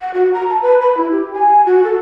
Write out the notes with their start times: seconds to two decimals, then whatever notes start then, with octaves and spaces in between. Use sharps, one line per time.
0.01 F#5
0.14 F#4
0.34 A#5
0.50 A5
0.62 B4
0.81 B5
0.97 E4
1.11 G4
1.33 G#5
1.66 F#4
1.84 A4